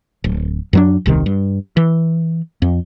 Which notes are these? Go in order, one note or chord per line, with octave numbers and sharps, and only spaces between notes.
D1
F#2 F#3 D4
D#1 C2 C3 D#3
G2
E3
F2